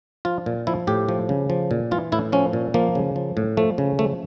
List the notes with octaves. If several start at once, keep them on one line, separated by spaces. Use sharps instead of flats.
F3 F4
A#2
F3 E4
A2 G4
F3
C#3
F3
A#2
E3 F4
A2 E4
F3 C#4
A#2
F3 A#3
C#3
F3
A2
F3 A3
C#3
F3 A3